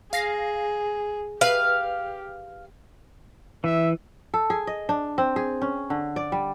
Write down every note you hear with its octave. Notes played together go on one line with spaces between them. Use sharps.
G#4 F5 A#6 C7
G4 B4 F5
E3 E5
A4
G#4
D#5
D4
C4
G#4
C#4
D3
D5
G3